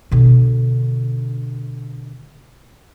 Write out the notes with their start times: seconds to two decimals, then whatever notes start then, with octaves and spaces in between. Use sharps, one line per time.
0.11 B2 D3